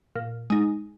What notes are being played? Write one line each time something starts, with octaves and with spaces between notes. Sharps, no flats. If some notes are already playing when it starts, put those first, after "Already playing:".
A#2
G#3 D#4